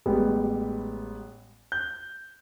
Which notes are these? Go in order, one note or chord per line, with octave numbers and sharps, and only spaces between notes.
A1 G3 G#3 B3
G6